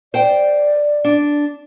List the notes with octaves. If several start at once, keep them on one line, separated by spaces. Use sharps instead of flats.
C5 D5 G5
D4